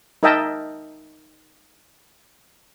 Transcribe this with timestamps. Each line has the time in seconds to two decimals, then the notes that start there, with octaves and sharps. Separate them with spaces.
0.23 D#4 A#4 D#5 E5 G5 A5